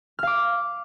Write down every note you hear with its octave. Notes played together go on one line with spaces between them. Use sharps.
F5 D6 F6